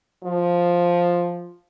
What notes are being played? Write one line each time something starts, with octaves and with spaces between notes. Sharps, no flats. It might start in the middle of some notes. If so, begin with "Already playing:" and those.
F3